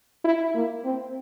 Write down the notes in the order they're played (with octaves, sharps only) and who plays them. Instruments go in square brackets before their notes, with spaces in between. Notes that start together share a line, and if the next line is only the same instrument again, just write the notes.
[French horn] E4
A#3
C4